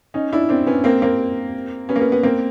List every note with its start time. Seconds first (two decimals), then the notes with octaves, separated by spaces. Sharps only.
0.14 C#4 D#4
0.33 D4 E4
0.49 C4 D4
0.67 B3 C#4
0.84 A#3 C4
1.02 A#3 C4
1.89 B3 C#4
1.96 A#3
2.01 B3
2.12 B3
2.23 A#3 C4